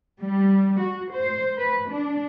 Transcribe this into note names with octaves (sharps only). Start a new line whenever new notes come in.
G3
F#4
C5
B4
D4